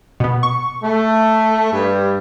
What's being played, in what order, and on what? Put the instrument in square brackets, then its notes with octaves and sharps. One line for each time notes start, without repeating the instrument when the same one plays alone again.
[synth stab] B2 B3
C#6
[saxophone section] A3
G2